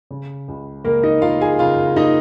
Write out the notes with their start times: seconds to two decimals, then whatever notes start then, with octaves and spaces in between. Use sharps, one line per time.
0.11 C#3
0.48 C#2
0.84 C#2 A#3 A#4
1.03 D#4 D#5
1.22 A#3 F4 F5
1.41 G#4 G#5
1.59 C#3 F4 F5
1.96 A#3 D#4 D#5